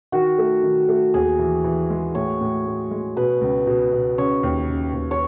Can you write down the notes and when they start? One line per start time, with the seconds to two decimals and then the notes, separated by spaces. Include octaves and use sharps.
0.12 D#3 F#4
0.38 A3
0.63 D#3
0.89 A3
1.14 D#2 G#4
1.39 E3
1.64 E3
1.90 G#3
2.15 A2 C#5
2.41 A2
2.66 A2
2.91 G#3
3.17 B2 B4
3.41 C#2
3.67 B2
3.93 B2
4.18 C#3 C#5
4.43 D#2
4.68 C#3
4.94 D#2
5.11 C#5